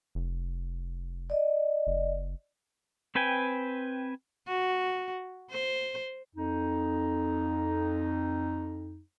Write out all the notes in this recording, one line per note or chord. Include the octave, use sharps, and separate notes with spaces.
F1
D5 D#5
F#1
C4 B4 G5 G#5
F#4
C5
F2 D#4